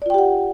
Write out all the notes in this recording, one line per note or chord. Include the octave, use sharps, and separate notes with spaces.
F4 G4 D5 F#5 G5